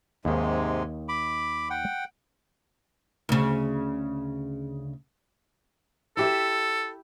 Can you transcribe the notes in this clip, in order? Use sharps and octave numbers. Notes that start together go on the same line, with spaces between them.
D#2 G#2 C3 D#3 G#3
B5 D6
F#5 G5
D2 C#3
E4 G4 A4 E5